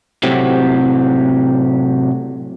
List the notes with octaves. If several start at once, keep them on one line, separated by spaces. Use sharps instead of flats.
A2 C3 F#3 C4 G4